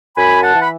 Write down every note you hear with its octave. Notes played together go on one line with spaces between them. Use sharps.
F#2 G#5 B5
F#5 A5
E3
B5